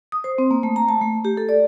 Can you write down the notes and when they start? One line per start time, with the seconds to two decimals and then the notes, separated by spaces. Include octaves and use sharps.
0.12 D#6
0.24 C5
0.38 C4
0.51 A#3
0.63 A3
0.76 A#5
0.89 A5
1.01 A3
1.25 G4
1.37 A4
1.49 D5